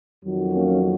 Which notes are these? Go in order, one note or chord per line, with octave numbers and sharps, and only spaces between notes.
F2 D#3 F#3
A#3 C#4